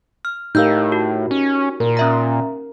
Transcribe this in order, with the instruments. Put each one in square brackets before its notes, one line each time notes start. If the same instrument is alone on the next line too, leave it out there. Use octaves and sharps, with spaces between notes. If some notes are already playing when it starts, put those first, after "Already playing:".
[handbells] F6
[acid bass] A2 [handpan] D#4 G4 A#4 [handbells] F5 E6 G6
[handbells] F#4
[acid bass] C#4
[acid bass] A#2 [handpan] A#4
[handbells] C#4 E5 A#5